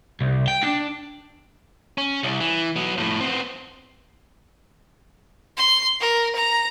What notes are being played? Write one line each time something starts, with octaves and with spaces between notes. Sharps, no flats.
C2
G5
D4
C#4
C2
E3
F#3 B3
F2 A2
B3 C4
C6
A#4
A#5